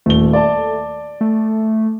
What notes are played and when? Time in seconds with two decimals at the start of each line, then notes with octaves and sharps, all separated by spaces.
0.06 D#1 A3 G7
0.33 D5 A5
1.21 A3